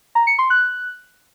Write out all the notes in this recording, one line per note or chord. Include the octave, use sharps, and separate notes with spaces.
A#5
C#7
C6
F#6